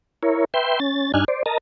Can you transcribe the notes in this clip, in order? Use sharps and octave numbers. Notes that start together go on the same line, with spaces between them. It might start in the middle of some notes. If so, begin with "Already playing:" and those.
E4 A#4 C#5
B4 E5 G5 C6
C#4 A6
G2 D4 D#4 G#5 F6 F#6
C5 D5
A#4 D#5 A5 A#5